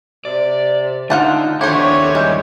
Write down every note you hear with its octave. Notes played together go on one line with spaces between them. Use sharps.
C3 D5
D3 D#4 F4 F#5 A5
D#2 D3 E4 G4 C5 C#5
G3 G#3